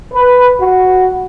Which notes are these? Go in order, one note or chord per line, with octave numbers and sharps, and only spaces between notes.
B4
F#4